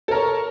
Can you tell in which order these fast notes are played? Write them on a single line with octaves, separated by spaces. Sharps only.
A4 A#4 C#5